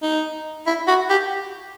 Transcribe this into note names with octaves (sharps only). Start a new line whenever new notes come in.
D#4
E4
F#4
G4